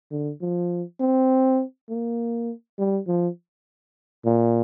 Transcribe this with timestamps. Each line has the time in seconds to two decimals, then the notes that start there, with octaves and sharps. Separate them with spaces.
0.11 D3
0.41 F3
1.00 C4
1.90 A#3
2.78 G3
3.07 F3
4.25 A#2